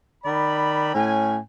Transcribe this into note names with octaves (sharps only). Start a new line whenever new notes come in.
D#3 D5 B5
A2 C#4 G#5